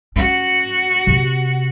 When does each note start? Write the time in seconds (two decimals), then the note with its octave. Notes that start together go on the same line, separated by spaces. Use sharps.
0.16 C#4 F#4 F#5
1.07 C3